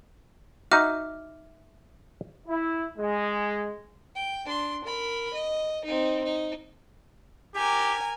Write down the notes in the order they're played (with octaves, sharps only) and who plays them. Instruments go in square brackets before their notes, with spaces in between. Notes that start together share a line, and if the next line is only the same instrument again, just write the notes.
[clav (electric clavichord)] D#4 F#4 [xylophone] E5 D6 F6
[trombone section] E4
G#3
[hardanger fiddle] G5
D4 C6
A#4 B5
D#5
C4 D#4
D#4
[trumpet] G4 [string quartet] A#4 G#5